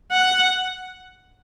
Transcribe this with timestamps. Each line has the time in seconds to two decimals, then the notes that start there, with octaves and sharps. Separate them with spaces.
0.12 F#5